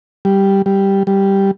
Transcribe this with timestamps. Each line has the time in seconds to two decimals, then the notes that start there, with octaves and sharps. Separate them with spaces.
0.25 G3
0.66 G3
1.07 G3